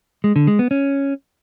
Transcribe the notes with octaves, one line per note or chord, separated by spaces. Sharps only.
G#3
D3
G#3
B3
C#4